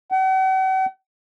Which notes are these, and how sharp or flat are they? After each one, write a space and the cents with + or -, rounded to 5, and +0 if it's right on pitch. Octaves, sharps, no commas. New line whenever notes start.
F#5 +45